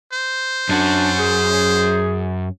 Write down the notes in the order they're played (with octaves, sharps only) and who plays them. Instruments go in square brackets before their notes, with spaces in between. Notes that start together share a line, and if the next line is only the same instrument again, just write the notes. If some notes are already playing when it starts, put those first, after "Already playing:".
[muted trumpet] C5
[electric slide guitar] F#2 C#4 F#4 [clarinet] D4
[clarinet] G#4